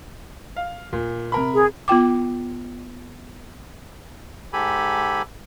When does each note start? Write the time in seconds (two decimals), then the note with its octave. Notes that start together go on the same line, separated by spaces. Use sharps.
0.56 F5
0.93 A#2
1.32 C3 A#4 B5
1.54 G#4
1.88 B3 F4 G5 D6
4.53 G#2 G4 A4 G#5 B5